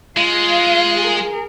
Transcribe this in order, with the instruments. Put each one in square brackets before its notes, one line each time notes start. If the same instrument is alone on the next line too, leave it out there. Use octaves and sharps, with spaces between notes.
[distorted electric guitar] G#3 [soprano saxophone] F4 [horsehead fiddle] F5
[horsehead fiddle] G#4 A#4